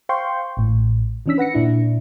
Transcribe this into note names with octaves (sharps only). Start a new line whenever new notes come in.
C5 F5 G5 C6 C#6 G6
A1 A2
D#3 E3 C#4 D4 E6 B6
B4 F#5 A#6 C#7
A#2 D4 E4